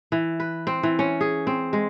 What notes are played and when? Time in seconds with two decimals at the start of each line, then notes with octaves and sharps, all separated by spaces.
0.12 E3
0.40 B4
0.67 C4
0.83 E3
0.99 C#4
1.21 G#4
1.47 C4
1.73 G#3